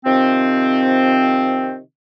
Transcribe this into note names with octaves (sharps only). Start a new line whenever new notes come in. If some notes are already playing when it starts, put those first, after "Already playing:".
C3 D#3 F3 C4